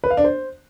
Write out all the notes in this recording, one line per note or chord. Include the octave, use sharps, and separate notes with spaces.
B4
F5
D4
C5